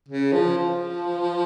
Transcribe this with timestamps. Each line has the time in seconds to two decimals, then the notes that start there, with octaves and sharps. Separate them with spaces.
0.09 C#3
0.33 F3
0.57 F3